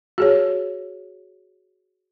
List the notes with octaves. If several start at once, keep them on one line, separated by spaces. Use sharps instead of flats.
F#4 G#4 C#5